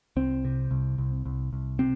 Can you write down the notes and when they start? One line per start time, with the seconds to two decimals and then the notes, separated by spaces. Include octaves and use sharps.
0.16 C2 C4
0.45 C3
0.71 C2
0.98 C2
1.25 C2
1.53 C2
1.79 C3 C4